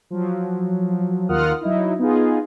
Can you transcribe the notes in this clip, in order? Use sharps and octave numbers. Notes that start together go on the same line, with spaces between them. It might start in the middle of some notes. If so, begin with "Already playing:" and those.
F3 F#3
D#2 F4 A#4 F#5 D#6 F6
F#3 D#4 E4
B3 D#4 F4 G#4